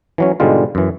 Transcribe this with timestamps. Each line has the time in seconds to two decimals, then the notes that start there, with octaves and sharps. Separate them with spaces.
0.18 E3 F#3 C#4
0.40 G#2 B2 D3 G3 G#3 F4
0.75 F#2 E3